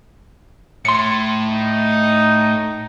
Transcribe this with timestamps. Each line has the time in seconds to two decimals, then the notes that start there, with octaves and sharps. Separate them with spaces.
0.85 A2 C6 C#7
1.49 D#4